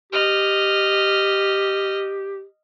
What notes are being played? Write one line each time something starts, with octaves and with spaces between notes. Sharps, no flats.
G4 D#5 F6